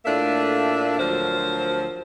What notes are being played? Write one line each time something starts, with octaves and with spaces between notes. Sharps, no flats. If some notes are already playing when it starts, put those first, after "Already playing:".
A2 A3 A#3 D4 F4 E5
D2 F3 F#3 A#4 C5